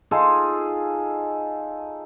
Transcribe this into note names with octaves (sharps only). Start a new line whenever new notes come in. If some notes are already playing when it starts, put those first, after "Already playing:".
D#4 F4 G#4 A4